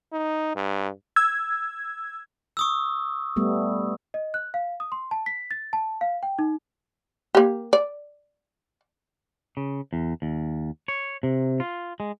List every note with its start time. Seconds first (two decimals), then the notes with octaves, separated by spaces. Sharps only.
0.13 D#4
0.56 G2
1.16 E6 G#6
2.57 C#6 D#6 E6
3.36 G3 A3 B3
4.14 D#5
4.34 F#6
4.54 F5
4.80 D#6
4.92 C6
5.11 A5
5.26 B6
5.51 A6
5.73 A5
6.01 F5
6.23 G5
6.39 D#4
7.35 A#3 G4
7.73 D5
9.57 C#3
9.93 E2
10.22 D#2
10.88 C#5
11.23 C3
11.60 F4
12.00 G#3